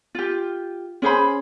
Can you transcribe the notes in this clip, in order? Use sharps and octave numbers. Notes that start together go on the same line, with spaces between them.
F4 G4
C#4 G#4 C5 B5